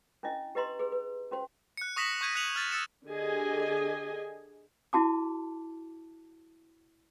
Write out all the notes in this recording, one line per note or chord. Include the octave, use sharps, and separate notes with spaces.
C#4 D4 E4 D#5
G4 B4 D#5 A#5 C6
G#4 B4
B4
C#4 F#4 C5
F#6 C#7
C#6 D#6 A#6 B6 E7 F#7
C#6 G6 G#6 D#7
F#6 A#6 C#7 D#7 F7 F#7
F6 A6
E6 A6 C#7 E7
D3 G4 G#4 D#5 G#5
E4 F#4 A5 D6